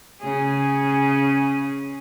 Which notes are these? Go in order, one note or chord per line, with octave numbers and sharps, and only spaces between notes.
C#3 C#4 G#4